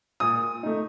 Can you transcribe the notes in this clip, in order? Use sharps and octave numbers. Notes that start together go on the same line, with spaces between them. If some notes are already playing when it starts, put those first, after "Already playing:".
A#2 D#6
A3 D#4